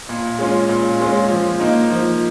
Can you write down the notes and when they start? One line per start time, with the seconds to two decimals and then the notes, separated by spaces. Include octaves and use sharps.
0.09 A#2
0.39 G#3 C#4 F4
0.69 A#2
1.00 G#3 C#4 F4
1.30 F3
1.60 A#3 D#4
1.90 F3